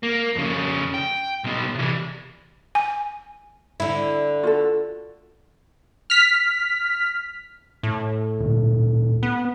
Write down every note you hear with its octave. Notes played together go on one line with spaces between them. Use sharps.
A#3
F2 C#3
G5
B1 B3
C3 E3
G#5
D3 E4
F4 F#4 A4
F6 B6
A2
D2 A#2 D3
B3